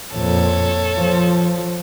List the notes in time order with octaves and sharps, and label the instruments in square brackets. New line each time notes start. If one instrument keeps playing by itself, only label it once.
[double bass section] F2 A#2 [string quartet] A4 C#5
[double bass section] F3